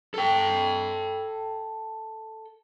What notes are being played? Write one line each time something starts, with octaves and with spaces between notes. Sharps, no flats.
A4 G5